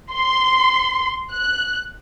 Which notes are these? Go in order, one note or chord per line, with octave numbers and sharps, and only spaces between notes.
C6
F#6